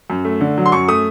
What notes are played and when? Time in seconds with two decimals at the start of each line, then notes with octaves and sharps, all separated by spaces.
0.10 F#2
0.25 A3
0.41 D3
0.58 F#3
0.66 C6
0.72 F#2 C#6
0.88 A3 D#6